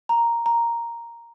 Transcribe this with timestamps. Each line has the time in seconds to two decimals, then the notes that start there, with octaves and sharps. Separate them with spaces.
0.09 A#5
0.46 A#5